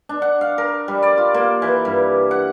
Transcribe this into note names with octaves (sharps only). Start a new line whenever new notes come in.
D4
F#5
F5
A#4
G3
D5
F4
A#3
E3
G2
F#5